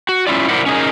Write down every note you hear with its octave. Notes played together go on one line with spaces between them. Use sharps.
F#4
C#4 E4 F4 D5
E4 A#4 C5 D5 E5 F#5
C#4 D#4 G#4 A#4